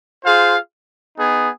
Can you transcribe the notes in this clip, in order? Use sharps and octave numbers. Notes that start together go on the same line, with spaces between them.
F4 G#4 C5 F5
B3 D#4 G#4